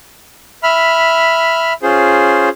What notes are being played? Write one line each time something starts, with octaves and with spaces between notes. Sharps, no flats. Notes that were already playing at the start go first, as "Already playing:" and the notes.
E5 B5 F6
C#4 F4 G#4 C5